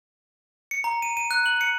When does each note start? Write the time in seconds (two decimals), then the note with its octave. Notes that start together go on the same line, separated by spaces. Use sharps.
0.71 C#7
0.84 A#5
1.02 D#7
1.17 D#7
1.31 F#6
1.46 F#7
1.61 C#7